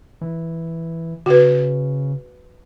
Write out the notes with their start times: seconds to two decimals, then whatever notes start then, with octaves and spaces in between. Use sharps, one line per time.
0.21 E3
1.26 C#3 F#4 B4